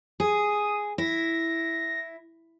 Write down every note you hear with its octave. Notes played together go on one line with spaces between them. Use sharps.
G#4 D#6
E4 A#6